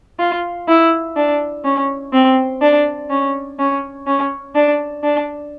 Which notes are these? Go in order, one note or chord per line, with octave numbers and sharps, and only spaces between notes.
F4
E4
D4
C#4
C4
D4
C#4
C#4
C#4
D4
D4